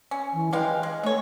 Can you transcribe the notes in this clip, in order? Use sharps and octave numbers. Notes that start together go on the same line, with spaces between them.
C#4
E3
G#3 G4 B4 F5
G#3
A3 D#4 C#5